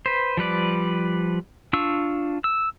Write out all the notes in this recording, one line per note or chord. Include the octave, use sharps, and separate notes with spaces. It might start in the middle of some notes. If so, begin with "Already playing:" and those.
B4 C5
F3 G3 B4 D5
D4 F4 C#6 E6
E6